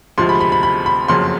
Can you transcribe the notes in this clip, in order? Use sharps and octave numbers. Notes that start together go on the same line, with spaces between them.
D2 C3 F3 G#3 C6
B5
B5
B5
B5
B5
F#1 F2 C#3 F#3 C6